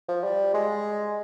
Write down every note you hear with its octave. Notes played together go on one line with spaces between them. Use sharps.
F3
G3
G#3